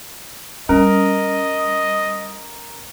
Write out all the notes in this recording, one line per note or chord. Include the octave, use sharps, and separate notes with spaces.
G3 C#4 A#4 D#5